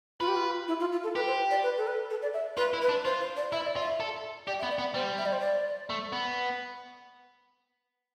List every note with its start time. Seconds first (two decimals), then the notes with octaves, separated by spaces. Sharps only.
0.20 F4 B4
0.28 G4
0.36 F4
0.68 E4
0.80 F4
0.92 F4
1.03 A4
1.15 G4 B4
1.27 C5
1.51 D5
1.63 B4
1.78 A4
1.87 B4
2.10 A4
2.22 D5
2.34 E5
2.57 F4 B4
2.73 E4
2.82 B4
2.89 D4
3.05 F4 C5
3.21 C5
3.36 D5
3.52 E4 E5
3.66 D5
3.76 F4
3.80 E5
4.00 A4
4.47 G4 D5
4.59 E5
4.63 B3
4.71 D5
4.78 B3
4.94 G3 C5
5.18 E5
5.26 D5
5.33 C5
5.40 D5
5.90 A3
6.13 B3